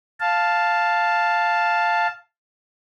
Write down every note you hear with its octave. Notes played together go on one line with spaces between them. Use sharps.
F5 A5